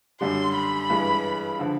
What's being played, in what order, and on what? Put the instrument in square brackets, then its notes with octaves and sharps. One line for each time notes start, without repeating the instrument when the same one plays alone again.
[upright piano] F#2 D3 G3 [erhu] C6
[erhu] B5
[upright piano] G2 E3 G#3
D3 F3